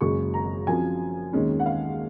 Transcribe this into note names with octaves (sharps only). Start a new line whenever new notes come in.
F#1 F#2 C#3 G#3 C#6
A#5
F#2 F3 C4 G#5
D#2 D#3 G#3 C#4
F#5
F5